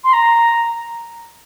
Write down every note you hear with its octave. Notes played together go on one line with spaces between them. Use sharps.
C6
A#5